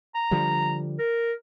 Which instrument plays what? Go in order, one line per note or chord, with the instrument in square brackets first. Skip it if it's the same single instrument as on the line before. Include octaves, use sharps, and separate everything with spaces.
[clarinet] A#5
[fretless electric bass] D3 F3 G3
[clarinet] A#4